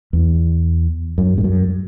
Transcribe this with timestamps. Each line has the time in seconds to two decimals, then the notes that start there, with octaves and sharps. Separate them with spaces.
0.13 E2
1.18 F#2
1.38 G#2
1.44 F#2